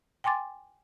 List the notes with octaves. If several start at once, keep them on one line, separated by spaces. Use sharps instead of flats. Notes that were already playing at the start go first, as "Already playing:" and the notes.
G5 G#5 C6 D6 A6